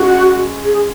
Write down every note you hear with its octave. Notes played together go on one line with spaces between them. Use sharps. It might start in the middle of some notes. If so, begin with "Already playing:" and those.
Already playing: G#3 C#4 F#4
G#4